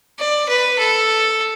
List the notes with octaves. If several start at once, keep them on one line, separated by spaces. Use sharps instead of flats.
D5
B4
A4